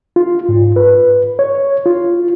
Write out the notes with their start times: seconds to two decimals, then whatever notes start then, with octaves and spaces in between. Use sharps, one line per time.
0.16 F4
0.49 G#2
0.76 B4
1.39 C#5
1.86 F4